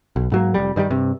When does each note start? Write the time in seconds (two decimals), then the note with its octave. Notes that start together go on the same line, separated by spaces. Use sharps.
0.16 B1
0.32 G#2 F#3 A#3
0.54 F1 C#2 G3
0.76 G2 D#3 F3 G3
0.90 G2 C3